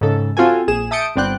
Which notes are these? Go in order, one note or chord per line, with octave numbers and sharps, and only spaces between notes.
G#2 C#3 A4
C4 F4 F#4 A4 G#5
A#1 G#4 E7
E5 A5 D#6 G6 C#7 D7
G1 B3 C4 D5 G5 F#6